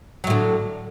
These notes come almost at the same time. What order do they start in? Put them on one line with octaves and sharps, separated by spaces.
F#3 A2 D3